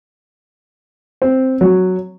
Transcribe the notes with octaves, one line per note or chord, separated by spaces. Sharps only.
C4
F#3